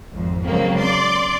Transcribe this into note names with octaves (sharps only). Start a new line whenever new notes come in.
G#1 F2
C#3 F#3 G#3 A#3 C4
D5 C6 D6